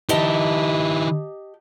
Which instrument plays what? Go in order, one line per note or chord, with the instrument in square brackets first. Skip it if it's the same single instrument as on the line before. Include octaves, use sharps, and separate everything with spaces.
[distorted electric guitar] D#3 E4 [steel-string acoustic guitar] G4 D#5 A5